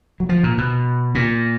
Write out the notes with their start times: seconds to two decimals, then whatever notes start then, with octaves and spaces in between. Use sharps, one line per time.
0.20 F#3
0.29 F3
0.43 A#2
0.58 B2
1.15 A#2